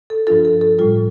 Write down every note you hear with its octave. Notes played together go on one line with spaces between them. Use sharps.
A4
G2 F3 D4 F4 A4
A4
A4
A2 G3 F4 A4